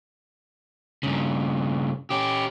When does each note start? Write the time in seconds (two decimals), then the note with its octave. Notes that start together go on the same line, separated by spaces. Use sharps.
1.03 G2 C#3
2.10 C#4 G4